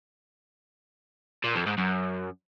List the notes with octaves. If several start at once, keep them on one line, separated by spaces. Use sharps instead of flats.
A#2
F2
G#2
F#2